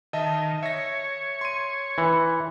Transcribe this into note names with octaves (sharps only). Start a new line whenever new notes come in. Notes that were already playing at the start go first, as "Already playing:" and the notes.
D#3 D#5 E5 A5
C#5 E5 A#6
C6 D#7
E3